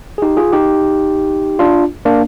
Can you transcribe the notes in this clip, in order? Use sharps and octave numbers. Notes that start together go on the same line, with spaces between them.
G#4
D#4 G4
F4 G#4
D#4 G4
D4 F4
A#3 D4